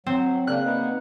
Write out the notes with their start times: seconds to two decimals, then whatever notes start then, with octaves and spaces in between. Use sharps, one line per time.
0.06 F#3 C4
0.47 C#3 A#3 D4 F#6
0.64 A#3 B3 D#4